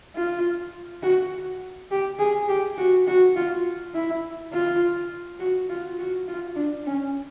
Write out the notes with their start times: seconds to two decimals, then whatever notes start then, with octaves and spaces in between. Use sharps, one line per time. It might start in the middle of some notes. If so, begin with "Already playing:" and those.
0.15 F4
1.03 F#4
1.91 G4
2.19 G#4
2.49 G4
2.78 F#4
3.07 F#4
3.36 F4
3.94 E4
4.52 F4
5.40 F#4
5.69 F4
5.99 F#4
6.28 F4
6.56 D4
6.86 C#4